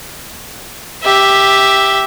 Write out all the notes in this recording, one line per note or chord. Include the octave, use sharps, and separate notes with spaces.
G4 E5